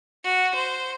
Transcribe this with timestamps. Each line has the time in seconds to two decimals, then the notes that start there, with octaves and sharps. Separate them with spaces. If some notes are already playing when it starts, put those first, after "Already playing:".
0.24 F#4
0.55 C5